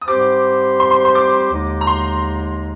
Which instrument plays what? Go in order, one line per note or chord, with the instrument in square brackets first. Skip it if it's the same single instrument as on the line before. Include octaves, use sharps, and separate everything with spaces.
[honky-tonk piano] D#6
[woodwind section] G#2 G3 C4 G4 C5 [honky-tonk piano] D6
[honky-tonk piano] C6
C6
C6
D6
[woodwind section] D#2 D3 G#3 D#4
[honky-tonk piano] A#5
C6